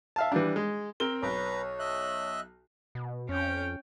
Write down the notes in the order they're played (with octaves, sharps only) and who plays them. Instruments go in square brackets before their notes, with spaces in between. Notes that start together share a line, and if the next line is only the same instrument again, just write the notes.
[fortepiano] E5 F5 A5
E3 G3 D4
G#3
[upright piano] C4 A#4 G7
[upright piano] B1 [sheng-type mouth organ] B4 A#5 [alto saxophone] C#5
[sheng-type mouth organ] D#5 E5 F#6
[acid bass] B2
[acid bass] F2 [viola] C#4 G5